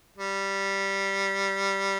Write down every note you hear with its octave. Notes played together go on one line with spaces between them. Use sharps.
G3